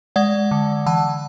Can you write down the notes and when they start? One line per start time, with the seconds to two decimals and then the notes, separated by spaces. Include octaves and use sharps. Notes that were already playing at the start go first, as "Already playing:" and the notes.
0.16 G#3 D5 F#5
0.51 D3
0.86 E3 F#5 A5